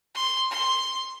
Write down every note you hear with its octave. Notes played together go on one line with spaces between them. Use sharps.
C6
C6